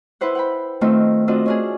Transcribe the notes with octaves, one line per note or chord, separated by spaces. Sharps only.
E4 B4 C5 F#5
F#5 G5 B5
D#3 A3 C4 D#4 F4
C4 D4 F4 F#4 D#5
C#4 D4 G#4